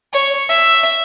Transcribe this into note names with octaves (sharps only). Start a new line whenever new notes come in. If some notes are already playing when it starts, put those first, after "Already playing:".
C#5
E5